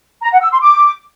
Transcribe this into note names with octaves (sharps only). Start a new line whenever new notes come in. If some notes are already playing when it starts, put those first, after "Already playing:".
A#5
F#5
E6
C6
D6